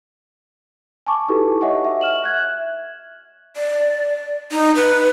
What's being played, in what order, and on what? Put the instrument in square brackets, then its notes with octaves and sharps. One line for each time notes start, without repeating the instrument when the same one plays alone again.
[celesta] G#5 A5 C#6 D6
D#4 E4 F#4 G4 A4 B4
C#5 D#5 E5 F#5 G#5 C#6
E5
F6 E7 F#7
E5 F#6 G#6
[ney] D5
D#4
B4